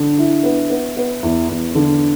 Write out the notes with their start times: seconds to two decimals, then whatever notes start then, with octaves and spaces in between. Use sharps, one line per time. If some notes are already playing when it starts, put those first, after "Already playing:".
Already playing: D3
0.18 E4
0.43 B3
0.70 B3
0.97 B3
1.23 E2
1.49 E2
1.75 D3